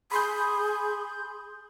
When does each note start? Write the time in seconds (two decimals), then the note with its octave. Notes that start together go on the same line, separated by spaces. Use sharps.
0.12 G#4 B5 C6 G6